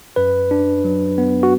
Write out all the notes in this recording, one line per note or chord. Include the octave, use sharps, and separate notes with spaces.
F#2 B4
D4
F#3
B3
F#4